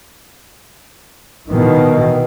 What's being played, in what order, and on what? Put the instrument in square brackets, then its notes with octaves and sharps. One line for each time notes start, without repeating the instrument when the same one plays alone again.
[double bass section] B2 D#3 E3